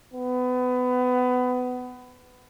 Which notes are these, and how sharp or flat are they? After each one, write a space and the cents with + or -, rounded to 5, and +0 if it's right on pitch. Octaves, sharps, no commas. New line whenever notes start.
B3 +25